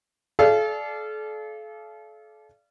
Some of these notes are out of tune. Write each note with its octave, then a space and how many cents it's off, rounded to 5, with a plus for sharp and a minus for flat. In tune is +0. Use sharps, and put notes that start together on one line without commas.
A4 -40 D5 +0 F5 -30